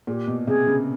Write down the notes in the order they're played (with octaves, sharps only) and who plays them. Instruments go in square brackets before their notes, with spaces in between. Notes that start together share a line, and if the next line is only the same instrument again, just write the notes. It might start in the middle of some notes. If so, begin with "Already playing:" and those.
[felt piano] A#2 [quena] G#4
[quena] G4
[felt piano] B2
[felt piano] C3 [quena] G#4
[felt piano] C#3